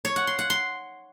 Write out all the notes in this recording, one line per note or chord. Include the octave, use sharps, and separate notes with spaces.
C#5
F#5
C6
F#5
C6